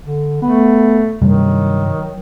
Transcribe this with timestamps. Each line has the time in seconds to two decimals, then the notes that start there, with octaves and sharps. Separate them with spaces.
0.06 D3
0.42 A3 B3
1.22 G2 C3 D#3 F#3 G3